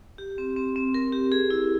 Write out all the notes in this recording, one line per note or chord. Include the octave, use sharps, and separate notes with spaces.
G4
C4
C4
C4
A#4
G4
G#4
E4